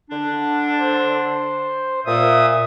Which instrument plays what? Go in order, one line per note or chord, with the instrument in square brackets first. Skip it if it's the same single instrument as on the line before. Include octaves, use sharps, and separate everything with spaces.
[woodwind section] D3 D4
[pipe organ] C5
[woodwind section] A#2 [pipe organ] E5 D#6